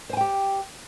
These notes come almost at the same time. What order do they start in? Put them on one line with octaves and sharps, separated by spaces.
C5 G#5 G5 G4